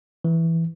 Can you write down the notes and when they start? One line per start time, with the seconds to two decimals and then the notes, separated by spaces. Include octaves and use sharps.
0.24 E3